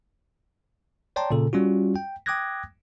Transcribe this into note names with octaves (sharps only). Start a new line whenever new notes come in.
C#5 D5 G5 A5 A#5 C6
A#2 C#3 A4
G3 C#4 F4 F#4
G5
G5 D6 D#6 F#6 G#6 A#6